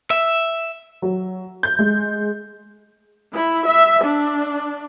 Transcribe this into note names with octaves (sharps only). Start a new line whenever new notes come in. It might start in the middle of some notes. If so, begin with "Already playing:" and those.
E5
F#3
G6
G#3
E4
E5
D4